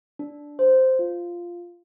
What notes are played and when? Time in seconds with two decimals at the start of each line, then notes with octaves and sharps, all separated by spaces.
0.19 D4
0.59 C5
0.99 F4